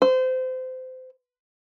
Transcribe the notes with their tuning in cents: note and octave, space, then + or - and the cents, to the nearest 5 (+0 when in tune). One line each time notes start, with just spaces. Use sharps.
C5 -25